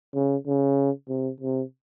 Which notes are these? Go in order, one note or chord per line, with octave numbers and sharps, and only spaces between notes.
C#3
C#3
C3
C3